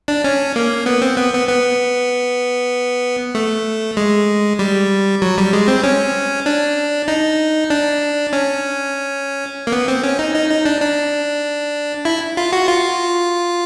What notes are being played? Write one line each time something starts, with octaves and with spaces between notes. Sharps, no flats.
D4
C#4
A#3
B3
C4
B3
B3
B3
A3
G#3
G3
F#3
G3
G#3
C4
C#4
D4
D#4
D4
C#4
A#3
B3
C4
C#4
D#4
D#4
D#4
D4
D4
E4
F4
F#4
F4